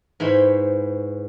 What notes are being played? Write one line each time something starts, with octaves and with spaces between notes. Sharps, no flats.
G#2 E3 C5 C#5 B5